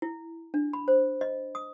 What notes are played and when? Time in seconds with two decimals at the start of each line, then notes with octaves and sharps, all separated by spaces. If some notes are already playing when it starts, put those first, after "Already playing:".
0.02 E4
0.54 D4
0.73 B5
0.88 C5
1.21 D#5
1.55 D#6